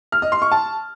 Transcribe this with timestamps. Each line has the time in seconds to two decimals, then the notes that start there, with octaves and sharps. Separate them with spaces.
0.12 F6
0.22 D#5
0.32 C6
0.42 C#6
0.51 A5